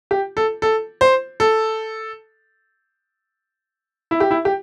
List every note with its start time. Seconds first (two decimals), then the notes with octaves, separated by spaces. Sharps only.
0.11 G4
0.37 A4
0.62 A4
1.01 C5
1.40 A4
4.11 E4
4.20 G4
4.31 E4
4.45 G4